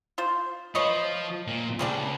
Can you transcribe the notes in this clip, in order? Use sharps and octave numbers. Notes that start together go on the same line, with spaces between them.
F4 C5
F3 F4 B4 C#5 D#5
A#2
C#2 F3 G3 D4